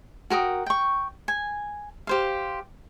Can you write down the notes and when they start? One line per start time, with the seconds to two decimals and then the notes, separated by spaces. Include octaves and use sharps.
0.30 F#4 A#4 G5 D#6
0.66 G5 C#6
1.28 G#5
2.07 G4 C5 F5